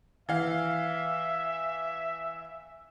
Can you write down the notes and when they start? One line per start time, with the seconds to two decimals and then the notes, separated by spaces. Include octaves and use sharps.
0.29 E3 E5 F5